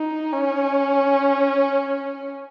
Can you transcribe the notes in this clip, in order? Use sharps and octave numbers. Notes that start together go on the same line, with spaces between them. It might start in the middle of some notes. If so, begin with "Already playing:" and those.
Already playing: D#4
C#4